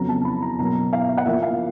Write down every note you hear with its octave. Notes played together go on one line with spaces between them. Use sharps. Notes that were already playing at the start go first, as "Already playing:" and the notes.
Already playing: F2 C#3 F#3 B3 A#5
A5
B5
A#5
B2 F#3 A#3 A#5
F5
E5
F5
F#5
A#2 F3 A#3 E5
F5